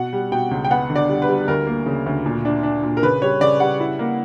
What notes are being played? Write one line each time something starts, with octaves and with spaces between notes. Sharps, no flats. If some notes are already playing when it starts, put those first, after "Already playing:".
Already playing: B2 F#5
G3
B2 G5
C#2
G5
B3 F#5
D3
D5
G3
B4
G3
D2 A#4
A#3
C#3
D2
A#2
D4
D4
A#2
A#4
C#3 B4
G3 C#5
C#3 D5
G3 F#5
E4
A#3